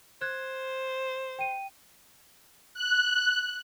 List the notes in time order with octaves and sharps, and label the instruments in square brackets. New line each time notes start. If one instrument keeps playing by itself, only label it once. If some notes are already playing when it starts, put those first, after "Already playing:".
[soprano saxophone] C5 [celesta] F#6 G#6
[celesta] G5 D#7
[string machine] F#6